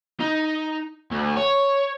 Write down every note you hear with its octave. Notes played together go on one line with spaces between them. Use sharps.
D#4
D2
C#5